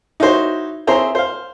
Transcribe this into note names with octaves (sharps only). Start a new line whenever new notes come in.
D#4 E4 F#4 C5 C#5
C4 E4 G#4 C5 C#5 A#5
C5 F5